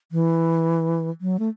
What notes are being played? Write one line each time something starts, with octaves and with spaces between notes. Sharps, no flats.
E3
F#3
A3